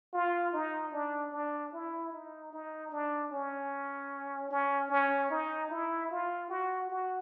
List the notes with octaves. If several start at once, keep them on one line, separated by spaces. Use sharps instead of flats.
F4
D#4
D4
D4
E4
D#4
D#4
D4
C#4
C#4
C#4
D#4
E4
F4
F#4
F#4